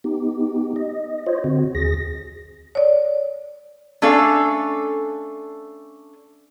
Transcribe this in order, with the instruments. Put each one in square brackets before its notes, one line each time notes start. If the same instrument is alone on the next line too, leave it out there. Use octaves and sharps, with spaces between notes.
[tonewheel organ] B3 D#4 G4
D#5
F4 C5 C#5 D#5
D3 C4 F#4
D#2 G#4 A#6
[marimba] C#5 D5
[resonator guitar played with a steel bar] A3 C#4 D4 A4 F5